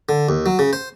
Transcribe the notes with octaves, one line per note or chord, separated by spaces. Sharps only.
D3
D#2
F#3
C#3
C5